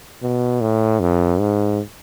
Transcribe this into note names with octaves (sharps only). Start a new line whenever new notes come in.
B2
A2
F2
G#2